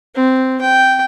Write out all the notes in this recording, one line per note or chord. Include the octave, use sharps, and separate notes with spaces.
C4
G5